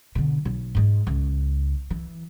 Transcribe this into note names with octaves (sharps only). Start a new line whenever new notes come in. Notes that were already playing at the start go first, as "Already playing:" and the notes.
B2 D3
B1
G#2 G#3
C#2
E3